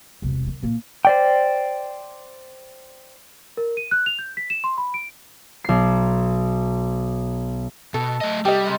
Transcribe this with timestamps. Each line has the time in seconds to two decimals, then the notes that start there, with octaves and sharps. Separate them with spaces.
0.22 E1 C2
0.47 D#3
0.63 A#2 A#3
1.05 C5 D5 G5
3.57 A#4
3.77 D#7
3.91 F#6
4.06 F7
4.19 G6
4.37 B6
4.50 E7
4.64 C6
4.78 B5
4.94 D7
5.64 B1 C7
7.94 B2 A4
8.21 A3 D#5
8.45 C3 G3 G4 D#5
8.65 C3 G#3 D#5